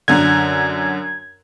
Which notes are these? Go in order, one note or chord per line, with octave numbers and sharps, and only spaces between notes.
F#2 D3 G#6